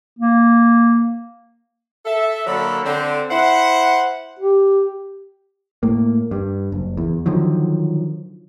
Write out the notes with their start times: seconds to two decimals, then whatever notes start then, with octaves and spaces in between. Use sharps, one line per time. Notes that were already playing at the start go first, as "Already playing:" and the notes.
0.19 A#3
2.05 A4 E5
2.47 D3 F#3 A#3 A4 B5
2.84 D3 C4
3.30 E4 C5 F#5
4.39 G4
5.83 A2 A#3
6.31 G2
6.72 F#1
6.97 E2
7.26 D3 D#3 F3 F#3